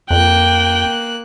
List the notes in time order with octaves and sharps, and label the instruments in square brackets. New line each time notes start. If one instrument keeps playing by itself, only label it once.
[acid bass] F2 [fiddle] A#3 F#6 [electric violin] G5